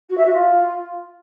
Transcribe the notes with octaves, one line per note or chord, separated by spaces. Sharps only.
F#4
E5
F#4
F4